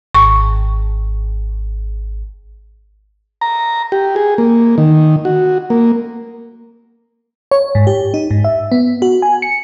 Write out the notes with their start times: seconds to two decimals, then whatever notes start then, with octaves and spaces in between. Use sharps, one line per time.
0.14 G#1 C#6
3.41 A#5
3.92 G4
4.16 G#4
4.38 A#3
4.78 D#3
5.25 F#4
5.70 A#3
7.51 C#5
7.75 G#2
7.87 G4
8.14 D#4
8.31 G#2
8.44 E5
8.72 B3
9.02 F#4
9.22 G#5
9.42 C#7